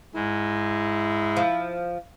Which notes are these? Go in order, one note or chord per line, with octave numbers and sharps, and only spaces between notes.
G#2 G#3 E4
F3